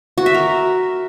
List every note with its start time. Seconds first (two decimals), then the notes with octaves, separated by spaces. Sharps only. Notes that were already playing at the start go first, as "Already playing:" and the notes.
0.18 F#4
0.26 E5
0.34 A#4